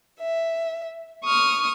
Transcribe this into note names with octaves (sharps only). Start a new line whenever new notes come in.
E5
C#6 D#6 F6